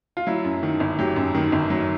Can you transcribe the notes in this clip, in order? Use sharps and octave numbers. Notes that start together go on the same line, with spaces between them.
F4
F#3 E4
F#2
D#3
G1
F#3 G4
F#2
D#3
G1
F#3